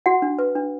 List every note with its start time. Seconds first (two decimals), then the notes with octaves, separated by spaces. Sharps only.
0.06 F#4 F#5
0.22 D4
0.39 B4
0.56 D4